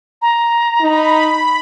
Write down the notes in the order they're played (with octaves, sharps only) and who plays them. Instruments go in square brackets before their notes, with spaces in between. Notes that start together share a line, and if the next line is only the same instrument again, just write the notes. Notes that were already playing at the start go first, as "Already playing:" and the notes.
[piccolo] A#5
[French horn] D#4 [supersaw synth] B5